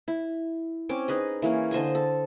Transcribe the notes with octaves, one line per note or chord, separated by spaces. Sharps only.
E4
C4 C#4 D6
D#4 G#4 B4 D#5
E3 A#3 C#4
D3 C5 D#5 G#5
A4